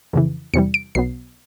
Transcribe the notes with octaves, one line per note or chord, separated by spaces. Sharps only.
F2 C#3 E3
E2 C3 E3 G3 C#7
D7
B1 B2 F#3 B3 C7